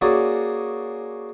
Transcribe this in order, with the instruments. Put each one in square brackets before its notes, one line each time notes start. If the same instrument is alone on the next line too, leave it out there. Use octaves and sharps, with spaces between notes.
[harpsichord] A#3 C#4 F#4 G#4 D5